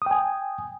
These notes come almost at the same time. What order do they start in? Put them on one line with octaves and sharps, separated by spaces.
D#6 G5 G#5